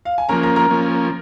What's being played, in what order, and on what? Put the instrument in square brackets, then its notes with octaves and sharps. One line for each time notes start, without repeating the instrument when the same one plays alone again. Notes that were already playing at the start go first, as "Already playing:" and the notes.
[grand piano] F5
G#5
[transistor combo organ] F3 A#3 C#4 [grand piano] A#4 A#5
[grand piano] A#4 A#5
A#4 A#5
[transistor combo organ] F3 A#3 C#4